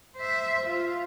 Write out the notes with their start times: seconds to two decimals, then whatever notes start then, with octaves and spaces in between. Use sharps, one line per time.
0.17 C5 E5
0.66 F4